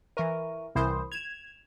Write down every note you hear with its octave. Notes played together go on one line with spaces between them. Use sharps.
E3 A#4 E5 C#6 D#7
C2 E3 A#4 C5 B5 D#6
G#6 E7 F7